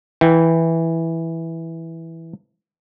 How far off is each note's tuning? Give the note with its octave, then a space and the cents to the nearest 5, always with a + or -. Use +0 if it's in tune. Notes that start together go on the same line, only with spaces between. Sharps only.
E3 -5 G5 +0